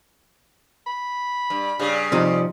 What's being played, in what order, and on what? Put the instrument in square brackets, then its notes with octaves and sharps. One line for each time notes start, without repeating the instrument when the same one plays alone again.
[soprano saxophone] B5
[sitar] G2
G2 C#3 G3
[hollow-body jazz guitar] C3 F3 D#4